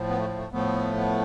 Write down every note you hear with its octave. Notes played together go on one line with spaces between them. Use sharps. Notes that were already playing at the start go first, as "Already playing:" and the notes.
Already playing: A2 F3
B3
A3
A3
A2 F3 A3 B3
B3